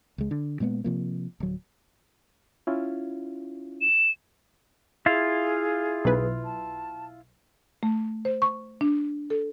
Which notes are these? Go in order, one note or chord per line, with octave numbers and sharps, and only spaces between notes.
C#2 G#3
D3
A#2 G#3 A#3 B3
C3 F3 A#3
D1 F#3
C#4 E4 F4
E7
E4 F4 G#4 F5
B1 B4
A5
A3
C5
C#6
D4
A4